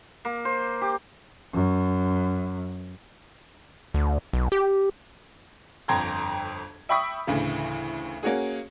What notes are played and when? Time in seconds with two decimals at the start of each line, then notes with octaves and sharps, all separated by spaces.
0.25 A#3
0.45 C5
0.81 G4
1.53 F#2
3.94 D2
4.33 B1
4.52 G4
5.88 G1 F2 G5 A#5 C6 G#6
6.89 E5 G5 B5 C#6 D#6 B6
7.27 D2 A2 C#3 E3
8.23 A#3 C#4 F#4 G#4